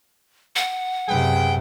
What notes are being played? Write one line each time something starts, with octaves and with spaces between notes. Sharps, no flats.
F#5
F#2 C3 G#4 B4 G5